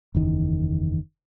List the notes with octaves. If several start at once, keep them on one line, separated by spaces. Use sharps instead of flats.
F#1 E2 D#3